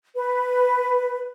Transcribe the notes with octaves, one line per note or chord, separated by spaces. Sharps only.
B4